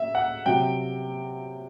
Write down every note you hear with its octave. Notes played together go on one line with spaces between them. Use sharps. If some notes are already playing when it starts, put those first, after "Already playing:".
Already playing: E5
F#5
C3 F#3 G5